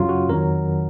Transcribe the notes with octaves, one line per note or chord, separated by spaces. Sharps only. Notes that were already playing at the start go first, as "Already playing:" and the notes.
Already playing: F#2 C#3 F#3 F4
F#4
F2 D#3 F#3 A#4